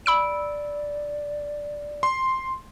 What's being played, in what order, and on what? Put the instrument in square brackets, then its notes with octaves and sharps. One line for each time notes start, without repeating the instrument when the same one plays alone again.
[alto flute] D5 [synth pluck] B5 E6 D7
[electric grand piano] C6